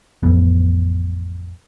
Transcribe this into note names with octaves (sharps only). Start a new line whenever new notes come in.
A1 F2 B3